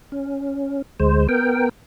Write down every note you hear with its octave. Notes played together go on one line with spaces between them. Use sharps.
C#4
D2 G#3 C5
B3 A#4 G5